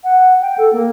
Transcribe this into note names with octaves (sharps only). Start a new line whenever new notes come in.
F#5
G5
A4
A#3